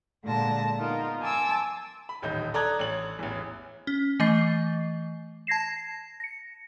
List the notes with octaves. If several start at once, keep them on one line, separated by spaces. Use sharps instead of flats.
A#2 D3 G#3 A5 A#6
B3 D#4 F4 A#4 F5
G#5 A5 C6 D6 E6
B5
D#1 A1 D#4 G6
A4 D5 A#5 D#6 F#6 G#6
A1 C#5 F#7
A1 E2
C#4
E3 A3 D#5 A6 C7
A5 G#6 A#6 C7 E7
A#6 C#7